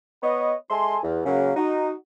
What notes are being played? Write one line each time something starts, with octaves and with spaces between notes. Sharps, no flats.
B3 B4 C#5 D#5
G#3 A4 E5 G#5 C6
E2
C#3 F#3 A#3
D#4 F#4